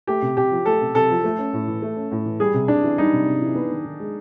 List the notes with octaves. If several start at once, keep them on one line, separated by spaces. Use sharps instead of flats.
A3 G4
C3
C3 G4
F3
A3 A4
C3
C3 A4
F3
A3
C#4
A2
E3
A3
C#4
A2
E3
G3 G#4
C3
C3 D4
E3
G3 D#4
C3
C3
E3
B3
D#3
D#3
G#3